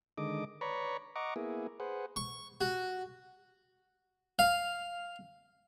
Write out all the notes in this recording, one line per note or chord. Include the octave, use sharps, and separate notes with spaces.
D3 D#3 G#3 D#5 D6
B4 C#5 D5 A#5 B5 C#6
D#5 F#5 A#5 C#6 D6
A#3 B3 E4 G#4
G#4 B4 C5 F#5
C#6
F#4
F5